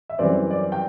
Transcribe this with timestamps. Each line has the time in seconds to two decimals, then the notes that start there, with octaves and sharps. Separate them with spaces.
0.10 E5
0.19 F#2 E3 G3 C4 D5
0.51 D5
0.72 G5